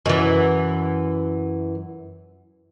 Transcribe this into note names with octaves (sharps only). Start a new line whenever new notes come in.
F#2 E3